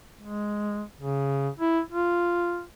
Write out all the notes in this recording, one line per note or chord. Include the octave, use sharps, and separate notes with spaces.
G#3
C#3
E4
F4